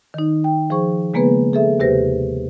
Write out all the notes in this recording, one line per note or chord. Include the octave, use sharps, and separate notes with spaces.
D#3 D#4
G5
F3 G#4 C5 C#6
C#3 G#3 A#3 B3 G#4 B4
G#4 A4 E5
D#2 C3 G4 B4 C5 A#6